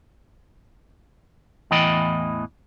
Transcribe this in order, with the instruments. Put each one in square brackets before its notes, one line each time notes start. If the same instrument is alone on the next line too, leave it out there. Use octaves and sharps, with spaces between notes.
[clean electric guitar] E2 A2 E3 D#5 G5 B5